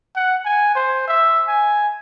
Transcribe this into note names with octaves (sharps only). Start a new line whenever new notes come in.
F#5
G#5
C5
E5
G#5